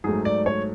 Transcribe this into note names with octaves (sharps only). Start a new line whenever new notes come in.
G#2 F#3 A3 G#4
D5
C#5